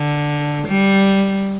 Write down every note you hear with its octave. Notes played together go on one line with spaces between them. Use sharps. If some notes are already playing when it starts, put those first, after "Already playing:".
Already playing: D3
G3